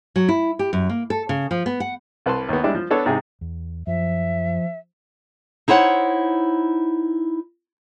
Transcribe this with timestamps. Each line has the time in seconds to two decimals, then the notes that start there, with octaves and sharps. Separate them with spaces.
0.16 F#3
0.29 E4
0.59 G4
0.73 F#2
0.89 A#3
1.10 A4
1.29 C#3
1.51 F3
1.66 B3
1.80 F#5
2.26 C2 B4 A5 C6
2.49 D#2 B3
2.63 G3 G#3 D4 E4
2.75 F3
2.91 B3 D4 A4 C#5
3.06 G#2 C3 G#4
3.41 E2
3.87 F#2 F3 E5
5.68 D#4 E4 C5 C#5 F#5